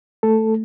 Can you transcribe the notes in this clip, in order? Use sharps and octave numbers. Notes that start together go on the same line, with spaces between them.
A3 A4